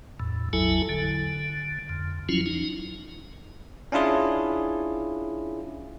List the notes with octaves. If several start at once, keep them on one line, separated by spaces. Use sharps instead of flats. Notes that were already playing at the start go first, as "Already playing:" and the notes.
E2 A2
A1 E2 F#3 E4 A4 G#5
D3
F2
F3 F#3 C#4 E4 F4
D#4
C#4 D4 E4 F4 G#4